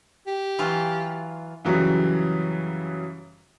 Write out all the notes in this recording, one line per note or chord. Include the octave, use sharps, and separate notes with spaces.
G4
E3 F#3 F4
F#2 C#3 E3 F#3 G3